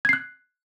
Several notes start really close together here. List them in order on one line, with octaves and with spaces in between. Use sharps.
G#6 C7 F#6